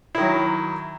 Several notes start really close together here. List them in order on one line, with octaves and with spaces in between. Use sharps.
E4 D#3 F#3